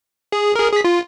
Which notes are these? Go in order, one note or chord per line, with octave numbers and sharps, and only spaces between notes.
G#4
G#4 A#4
G#4 B6
F4